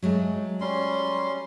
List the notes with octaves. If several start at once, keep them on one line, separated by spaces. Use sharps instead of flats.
F#3 G#3 A3
G3 C#4 C6